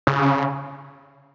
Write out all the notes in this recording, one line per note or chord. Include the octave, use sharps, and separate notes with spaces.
C#3